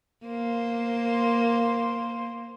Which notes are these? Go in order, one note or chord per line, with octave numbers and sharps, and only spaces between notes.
A#3 C5